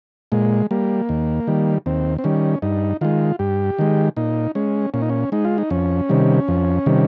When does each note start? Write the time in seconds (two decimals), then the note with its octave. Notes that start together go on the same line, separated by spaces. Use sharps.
0.32 A#2 G#3
0.71 G3 A#3
1.09 D#2
1.47 D#3 G3
1.86 D#2 C4
2.18 C4
2.24 D#3 G3 C#4
2.62 G2 D#4
3.01 D#3 G#3 F4
3.39 G2 G4
3.79 D#3 G#3
4.17 A#2 D#4
4.55 G#3 C#4
4.94 A#2 C#4
5.02 D#4
5.09 C#4
5.32 G#3 D#4
5.45 F4
5.58 D#4
5.70 F2 C#4
6.09 C3 D#3 G3
6.48 F2
6.86 C3 D#3 G3